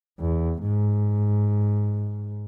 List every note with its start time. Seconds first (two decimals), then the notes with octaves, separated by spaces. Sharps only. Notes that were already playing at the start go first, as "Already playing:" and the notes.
0.20 E2
0.62 G#2